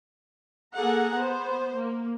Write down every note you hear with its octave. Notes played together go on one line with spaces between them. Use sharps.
A#3 G#4 A4 F#5 A#5
B3 C5
A#3